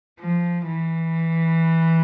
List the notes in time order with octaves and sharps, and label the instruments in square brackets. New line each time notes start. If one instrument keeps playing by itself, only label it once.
[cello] F3
E3